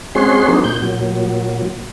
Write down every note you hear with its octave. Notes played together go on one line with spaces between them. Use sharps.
G#3 C4 C#4 F#4 G#4 C6
F#3 A#3 C4 D4 D#4
A#2 G6
A#2 F#3